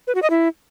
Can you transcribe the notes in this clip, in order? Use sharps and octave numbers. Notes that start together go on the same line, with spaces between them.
B4
F#4
D#5
E4